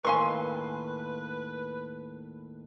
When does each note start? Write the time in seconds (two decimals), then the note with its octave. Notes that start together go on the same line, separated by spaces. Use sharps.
0.05 D#2 A2 A#4 B4 F5 G#5 C6 C#6